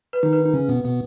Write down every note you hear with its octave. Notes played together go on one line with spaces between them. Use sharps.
B4
D#3 D#4
B4
D#4
C#3 C#4
B2 B3
B2 B3